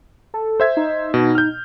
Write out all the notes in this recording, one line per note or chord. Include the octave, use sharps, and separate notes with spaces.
A4
C5 E5 G#6
D#4
B2
F6 G6